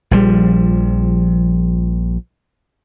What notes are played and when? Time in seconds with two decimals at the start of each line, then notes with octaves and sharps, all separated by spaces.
0.11 A#1 F3 G3